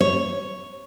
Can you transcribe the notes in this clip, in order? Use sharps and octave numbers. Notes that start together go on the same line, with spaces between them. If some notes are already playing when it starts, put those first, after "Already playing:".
C#5